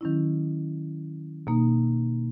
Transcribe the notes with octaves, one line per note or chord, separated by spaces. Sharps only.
D#3 F#3 C#4 E4
B2 A#3 D#4